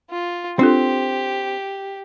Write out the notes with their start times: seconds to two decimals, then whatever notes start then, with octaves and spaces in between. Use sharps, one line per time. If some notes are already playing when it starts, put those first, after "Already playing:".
0.11 F4
0.59 C4 D4 F4 G4 A4